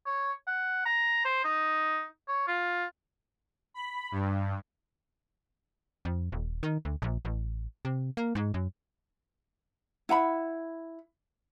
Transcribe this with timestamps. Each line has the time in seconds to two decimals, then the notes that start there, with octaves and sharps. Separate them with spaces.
0.06 C#5
0.47 F#5
0.85 A#5
1.25 C5
1.44 D#4
2.28 C#5
2.47 F4
3.74 B5
4.11 G2
6.05 F2
6.32 D#1
6.63 D#3
6.85 D2
7.02 A#1
7.25 A1
7.85 C3
8.17 A#3
8.35 G#2
8.54 F#2
10.09 E4 F#5 A#5 B5